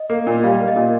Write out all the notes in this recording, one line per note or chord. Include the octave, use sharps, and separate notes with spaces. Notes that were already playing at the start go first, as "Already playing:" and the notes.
Already playing: D#5
A#3
A#2
G3 F5
A#3
D#5
A#2